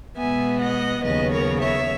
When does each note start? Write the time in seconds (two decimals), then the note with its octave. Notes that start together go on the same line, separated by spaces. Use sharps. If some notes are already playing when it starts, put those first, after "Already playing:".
0.17 B2 G#3 B3 E5 G#5
0.60 D#5 F#5
1.03 D#2 C#3 F#3 B3 B4 D#5
1.32 A#4 C#5
1.61 C#5 E5